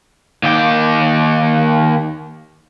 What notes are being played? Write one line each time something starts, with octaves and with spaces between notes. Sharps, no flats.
D#2 G4